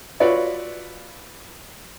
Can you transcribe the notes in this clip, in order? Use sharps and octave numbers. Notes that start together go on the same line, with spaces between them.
F4 F#4 B4 C#5 D5 E5